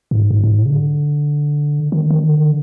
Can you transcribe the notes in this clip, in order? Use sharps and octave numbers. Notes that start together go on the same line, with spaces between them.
A2
G#2
G#2
G#2
A2
C#3
D3
D#3
D#3
D3
D#3
D3